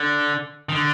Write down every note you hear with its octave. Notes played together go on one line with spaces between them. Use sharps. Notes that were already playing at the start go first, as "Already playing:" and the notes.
Already playing: D3
D#3
D3